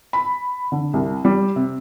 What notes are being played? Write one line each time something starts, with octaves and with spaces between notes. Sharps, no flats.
B5
D3
C2
G3
C3